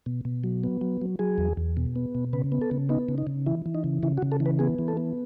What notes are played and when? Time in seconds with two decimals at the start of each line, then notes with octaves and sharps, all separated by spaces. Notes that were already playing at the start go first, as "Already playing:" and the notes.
0.06 B2
0.25 B2
0.44 F#3
0.64 B3
0.81 F#3
1.01 F#3
1.19 F#3 G#4
1.38 E2
1.57 E2
1.77 B2
1.96 B3
2.15 B2
2.33 C#3 B4
2.52 B3
2.61 A4
2.71 C#3
2.89 B3 D#4
3.09 C#3
3.18 D#4
3.27 C#3
3.46 E3 E4
3.66 E3
3.75 D#4
3.84 C#3
4.03 C#3 E4
4.18 F#4
4.22 C#3
4.32 A4
4.40 E3
4.46 B4
4.59 B3 G#4
4.79 E3
4.88 A4
4.97 B3